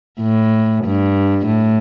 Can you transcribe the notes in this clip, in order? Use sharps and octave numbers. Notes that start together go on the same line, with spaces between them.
A2
G2
A2